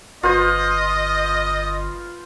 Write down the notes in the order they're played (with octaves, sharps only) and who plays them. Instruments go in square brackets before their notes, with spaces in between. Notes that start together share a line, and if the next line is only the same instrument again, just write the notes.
[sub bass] G1 [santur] F4 B4 C5 [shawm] D#5